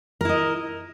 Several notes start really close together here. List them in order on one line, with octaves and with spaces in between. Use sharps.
A#4 E4 D#5